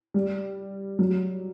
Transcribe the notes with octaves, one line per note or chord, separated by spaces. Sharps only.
G3
F#3